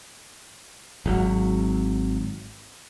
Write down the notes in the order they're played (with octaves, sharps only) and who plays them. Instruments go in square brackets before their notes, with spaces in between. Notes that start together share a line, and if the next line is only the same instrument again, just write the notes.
[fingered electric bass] G#1 F#3